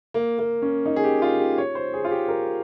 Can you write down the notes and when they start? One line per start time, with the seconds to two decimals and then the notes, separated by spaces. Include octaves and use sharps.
0.14 A#3
0.39 A#3
0.62 C#4
0.86 D#4
0.96 G#4
1.04 G4
1.22 F4
1.40 G4
1.58 C#5
1.75 C5
1.93 G#4
2.05 F4
2.11 G4
2.28 A#4